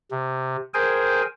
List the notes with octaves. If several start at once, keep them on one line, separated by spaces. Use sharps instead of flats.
C3
G#4 A#4 C5 G5 G#5